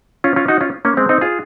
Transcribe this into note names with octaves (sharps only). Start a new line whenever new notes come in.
C#4 F4
C#4 F4
D#4 F#4
C#4 F4
A#3 C#4
G#3 C4
C4 D#4
F4 G#4